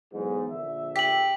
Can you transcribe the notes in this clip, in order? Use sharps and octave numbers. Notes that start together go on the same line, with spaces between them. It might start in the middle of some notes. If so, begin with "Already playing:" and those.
B1 E2 G#2
A#1 D3 E5
G4 B6 F#7